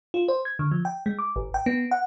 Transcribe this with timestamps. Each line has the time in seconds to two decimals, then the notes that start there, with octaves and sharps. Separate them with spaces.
0.14 F4
0.28 C5
0.45 G#6
0.59 D3
0.71 F3
0.85 G5
1.06 G#3
1.19 D6
1.36 G#1
1.54 G5
1.66 B3
1.91 F#5